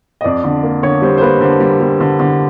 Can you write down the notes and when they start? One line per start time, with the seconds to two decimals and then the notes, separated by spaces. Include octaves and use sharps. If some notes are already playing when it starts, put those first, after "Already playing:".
0.21 D#5
0.24 F2 D5
0.44 D3
0.63 A#3
0.83 D3 C#5
1.02 G3 C5
1.18 C5
1.21 A#3 B4
1.41 D3 C5
1.60 G3
1.80 G3
2.00 D3
2.20 D3